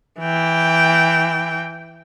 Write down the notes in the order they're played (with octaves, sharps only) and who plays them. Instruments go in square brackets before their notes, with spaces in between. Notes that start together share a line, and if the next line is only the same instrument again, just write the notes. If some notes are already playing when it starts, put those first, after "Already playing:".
[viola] E3 G5